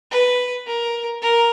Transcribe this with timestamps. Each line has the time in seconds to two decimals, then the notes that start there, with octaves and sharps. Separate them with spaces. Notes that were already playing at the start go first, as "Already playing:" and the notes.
0.11 B4
0.67 A#4
1.22 A#4